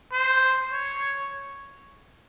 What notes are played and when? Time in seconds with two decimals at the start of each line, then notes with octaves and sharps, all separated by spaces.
0.13 C5
0.72 C#5